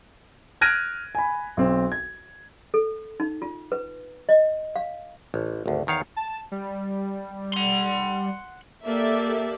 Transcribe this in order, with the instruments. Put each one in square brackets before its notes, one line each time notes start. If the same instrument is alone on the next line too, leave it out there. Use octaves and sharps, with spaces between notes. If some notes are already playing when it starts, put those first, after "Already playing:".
[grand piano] F6 F#6 G#6 A#6 D7 D#7
G#5 B5
B1 C4
G#6
[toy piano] A4
D#4
F4
B4
D#5
F5
[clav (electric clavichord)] A1
G#1 D2
E2 D#3 C#5 F5
[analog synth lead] A5
G3
[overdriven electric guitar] F#5 C6
[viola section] A#3 G4 A4 D5 E5